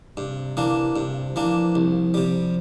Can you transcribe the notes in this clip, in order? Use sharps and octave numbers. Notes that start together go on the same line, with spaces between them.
G2 C3
E3 A#3 D4
G2 C3
E3 F3 A#3 D4
C2
C3 G3